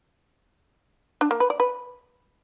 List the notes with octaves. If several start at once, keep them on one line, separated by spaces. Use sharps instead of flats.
D4
A#3
B4
D5
B4